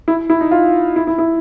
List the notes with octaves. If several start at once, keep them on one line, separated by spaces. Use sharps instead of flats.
E4
E4
D#4
F4
E4
E4
E4